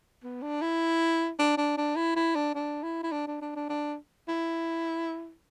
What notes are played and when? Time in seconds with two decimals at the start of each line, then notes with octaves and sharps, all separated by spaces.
0.24 B3
0.42 D4
0.61 E4
1.39 D4
1.57 D4
1.77 D4
1.96 E4
2.16 E4
2.35 D4
2.55 D4
2.83 E4
3.03 E4
3.12 D4
3.27 D4
3.41 D4
3.56 D4
3.69 D4
4.28 E4